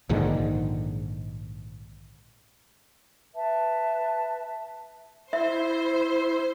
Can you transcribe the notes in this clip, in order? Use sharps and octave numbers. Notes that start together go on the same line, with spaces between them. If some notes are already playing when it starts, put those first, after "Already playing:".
A#1 G#2 D3 D#3
B4 E5 A5
E4 C5 E5